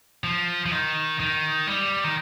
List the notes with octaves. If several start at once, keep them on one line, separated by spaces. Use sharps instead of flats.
F3
F3
D#3
D#3
G3
D#3